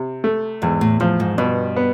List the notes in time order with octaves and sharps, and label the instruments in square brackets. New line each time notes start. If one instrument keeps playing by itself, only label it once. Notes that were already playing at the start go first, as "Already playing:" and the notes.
Already playing: [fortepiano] C3
A3
[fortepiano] E2 [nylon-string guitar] G#2
[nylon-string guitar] A2
[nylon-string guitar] A2 [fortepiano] F3
[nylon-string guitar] G#2
[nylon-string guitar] G2 [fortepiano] B2
[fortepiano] B3